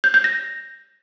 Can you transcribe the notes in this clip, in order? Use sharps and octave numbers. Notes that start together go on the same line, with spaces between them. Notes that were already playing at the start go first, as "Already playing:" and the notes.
G6
G6
A#6